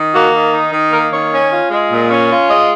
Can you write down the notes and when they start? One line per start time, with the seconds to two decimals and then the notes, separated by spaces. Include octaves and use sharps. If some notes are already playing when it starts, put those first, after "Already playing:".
Already playing: D#3
0.13 A#3 F#4
0.34 D#3
0.53 D#4
0.72 D#3
0.92 A#3 A#4
1.12 D#3 C#5
1.32 C#4
1.51 F4
1.71 G#3
1.91 A#2
2.11 C#4
2.30 F4
2.50 G#3 D#5